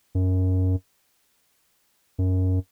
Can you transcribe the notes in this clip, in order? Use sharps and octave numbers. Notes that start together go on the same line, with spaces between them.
F#2
F#2